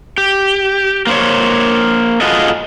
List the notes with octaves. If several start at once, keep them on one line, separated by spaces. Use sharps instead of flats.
G4
A#3 C5 C#5
F4 F#4 G#4 A4 D#5